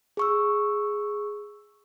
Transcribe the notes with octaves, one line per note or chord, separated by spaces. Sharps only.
G#4 C#6 E6